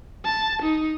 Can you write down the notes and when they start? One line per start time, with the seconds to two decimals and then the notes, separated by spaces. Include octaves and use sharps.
0.25 A5
0.62 D#4